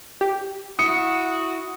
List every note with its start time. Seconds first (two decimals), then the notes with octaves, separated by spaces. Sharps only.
0.21 G4
0.79 E4 F#4 D#6 C#7